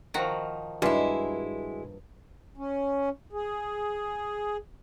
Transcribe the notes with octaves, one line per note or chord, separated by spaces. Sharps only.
D#3 F3 F#4 A#5
G2 G#3 E4 F#4 G#5 C6
C#4
G#4